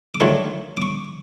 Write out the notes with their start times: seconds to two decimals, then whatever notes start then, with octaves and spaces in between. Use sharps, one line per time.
0.15 D6
0.20 D#3 F#3 A3 D4 F4 C#6
0.77 D6
0.82 C#6